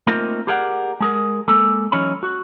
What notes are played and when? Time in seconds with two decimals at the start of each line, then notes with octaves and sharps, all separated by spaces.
0.07 A3 A#3 C4 D#4 F4 A#4
0.47 G4 G#4 A#4 D5 E5 F#5
1.00 G#3 G#4 A#4
1.48 G#3 A#3 A4
1.92 E3 F#3 C#4 D#4 C#5 B5
2.23 F#4